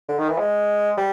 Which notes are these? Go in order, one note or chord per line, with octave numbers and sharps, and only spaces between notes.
D3
D#3
E3
G#3
G3